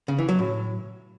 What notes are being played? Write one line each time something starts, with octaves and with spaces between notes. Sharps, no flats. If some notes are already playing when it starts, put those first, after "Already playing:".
C#3
E3
F#3
A2